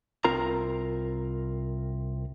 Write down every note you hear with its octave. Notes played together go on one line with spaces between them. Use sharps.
C2 C4 F4 A#4 A#5